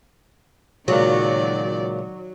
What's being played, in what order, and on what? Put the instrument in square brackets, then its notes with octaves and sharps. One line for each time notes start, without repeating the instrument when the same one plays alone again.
[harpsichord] C#2 A#2 [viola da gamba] D#3 D5 [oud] F#3